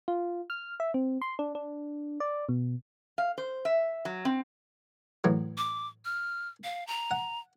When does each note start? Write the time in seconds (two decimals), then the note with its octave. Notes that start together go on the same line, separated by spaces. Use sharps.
0.08 F4
0.50 F6
0.80 E5
0.94 C4
1.22 C6
1.39 D4
1.55 D4
2.20 D5
2.49 B2
3.18 F5
3.38 C5
3.65 E5
4.05 F#3
4.25 C4
5.24 E2 A2 F#3
5.58 D6
6.05 F6
6.64 F5
6.87 A#5
7.11 F#5